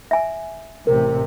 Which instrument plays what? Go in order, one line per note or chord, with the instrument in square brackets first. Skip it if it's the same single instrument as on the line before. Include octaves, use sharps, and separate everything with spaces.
[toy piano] E5 G#5
[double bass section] A1 C3 [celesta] A#4